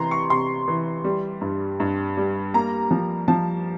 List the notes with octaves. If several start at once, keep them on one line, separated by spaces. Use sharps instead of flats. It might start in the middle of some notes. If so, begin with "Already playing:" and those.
Already playing: C3 E3 A#5 C6
C#6
C3 C6
E3
G3
G2
G2
G3
A#3 A#5
F3
F3 A5